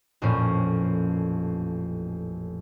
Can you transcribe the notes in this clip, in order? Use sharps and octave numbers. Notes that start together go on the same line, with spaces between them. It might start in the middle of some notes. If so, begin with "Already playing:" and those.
A1 F2 A#2 C#4